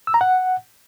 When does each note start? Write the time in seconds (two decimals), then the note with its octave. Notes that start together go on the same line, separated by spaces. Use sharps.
0.07 E6
0.14 A#5
0.21 F#5